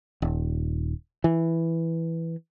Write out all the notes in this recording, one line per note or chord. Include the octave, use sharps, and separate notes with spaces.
D#1
E3